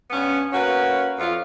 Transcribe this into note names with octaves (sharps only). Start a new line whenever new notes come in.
G2 B3 C#4
A#3 C#4 F#4 B4
F2 F4